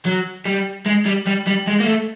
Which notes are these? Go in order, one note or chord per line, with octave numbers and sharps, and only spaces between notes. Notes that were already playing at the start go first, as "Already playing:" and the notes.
F#3
G3
G#3
G3
G3
G3
G#3
A#3
A3